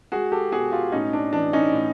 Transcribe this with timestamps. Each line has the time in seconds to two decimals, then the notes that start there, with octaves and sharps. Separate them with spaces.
0.12 G#3 F#4 G#4
0.32 G4 A4
0.52 B2 F#4 G#4
0.72 F4 G4
0.92 A2 C#4 D#4
1.13 D4
1.33 E3 D4
1.53 C#4 D#4
1.73 A2